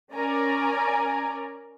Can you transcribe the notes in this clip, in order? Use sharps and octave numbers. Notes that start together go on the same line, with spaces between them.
C#4 A#4 D5 G#5 A#5